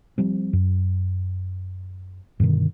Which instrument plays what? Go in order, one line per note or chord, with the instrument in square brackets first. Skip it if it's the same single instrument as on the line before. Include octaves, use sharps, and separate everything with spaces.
[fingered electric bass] F3 G3 C4
F#2
G2 B2 D3 D#3